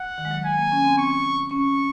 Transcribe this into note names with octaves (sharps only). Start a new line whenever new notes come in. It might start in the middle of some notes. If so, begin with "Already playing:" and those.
Already playing: F#5
D#3
G#3
F#3
G#3 G#5
A#3
C#4
C4
C4 C#6
C#4 C#6